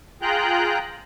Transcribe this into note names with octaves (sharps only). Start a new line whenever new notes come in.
F4 G#4 G5 A#5 F#6 G6